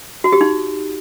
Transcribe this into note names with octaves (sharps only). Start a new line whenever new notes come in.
F#4
G4
D#4